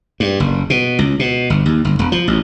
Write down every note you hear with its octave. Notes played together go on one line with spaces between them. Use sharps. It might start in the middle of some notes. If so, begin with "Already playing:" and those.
G2
F#1
B2
C#2
B2
G1
D#2
G1
E1
F3
A1